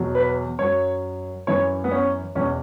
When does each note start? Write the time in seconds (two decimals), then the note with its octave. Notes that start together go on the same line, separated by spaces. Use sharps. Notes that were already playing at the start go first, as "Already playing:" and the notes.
Already playing: E2 B2 F#3
0.15 B4
0.59 F#2 F#3 C#5
1.47 F#2 E3 C#5
1.84 B3
1.91 C#4
2.35 E2 B2 F#3 C#4